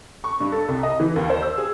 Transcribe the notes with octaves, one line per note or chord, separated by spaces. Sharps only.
C#6
G2
A4
C2
D#5
E3
D#2
C5
E6
G#4